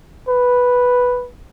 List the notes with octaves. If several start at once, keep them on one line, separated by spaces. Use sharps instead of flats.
B4